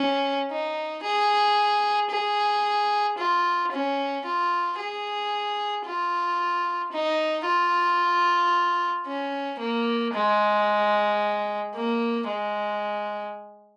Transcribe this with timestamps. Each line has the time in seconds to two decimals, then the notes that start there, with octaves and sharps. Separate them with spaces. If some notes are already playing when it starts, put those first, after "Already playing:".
Already playing: C#4
0.50 D#4
1.03 G#4
2.10 G#4
3.17 F4
3.72 C#4
4.24 F4
4.78 G#4
5.85 F4
6.92 D#4
7.45 F4
9.06 C#4
9.60 A#3
10.14 G#3
11.75 A#3
12.28 G#3